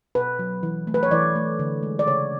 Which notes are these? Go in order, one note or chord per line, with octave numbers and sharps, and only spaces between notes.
B2 B4
F#3
E3
A3
B4
C#5
E3 D5
A3
D3
G#3
D5
C#3 C#5